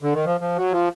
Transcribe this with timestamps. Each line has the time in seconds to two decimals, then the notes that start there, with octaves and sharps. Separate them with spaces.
0.02 D3
0.14 D#3
0.25 F3
0.41 F3
0.56 F#3
0.72 F3